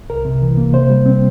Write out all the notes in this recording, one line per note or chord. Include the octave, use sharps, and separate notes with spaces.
C2 A#4
C3
E3
A#3
C3 C5
G3
C4